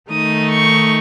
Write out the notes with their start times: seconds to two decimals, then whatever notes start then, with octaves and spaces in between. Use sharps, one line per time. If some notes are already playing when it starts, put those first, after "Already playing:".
0.11 D#3 A3 D#4 D#6
0.50 C#6